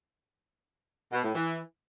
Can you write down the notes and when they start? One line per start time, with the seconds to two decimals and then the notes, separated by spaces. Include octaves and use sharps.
1.13 B2
1.23 A2
1.34 E3